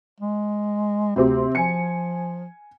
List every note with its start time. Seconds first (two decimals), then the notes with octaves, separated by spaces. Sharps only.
0.20 G#3
1.16 D2 C3 C4 G4
1.55 F3 G#5 C#7